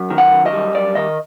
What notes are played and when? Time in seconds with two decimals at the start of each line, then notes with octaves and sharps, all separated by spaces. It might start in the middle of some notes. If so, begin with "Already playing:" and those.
Already playing: F#2
0.10 D#3
0.18 F#5
0.32 F#2
0.46 D#5
0.53 G3
0.75 F#2 D5
0.95 D#3 D#5